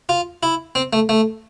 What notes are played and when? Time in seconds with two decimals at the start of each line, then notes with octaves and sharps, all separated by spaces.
0.09 F4
0.43 E4
0.75 C4
0.93 A3
1.09 A3